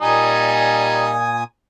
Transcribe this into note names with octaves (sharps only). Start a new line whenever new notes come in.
A#2 G3 D#4 G#5 D#6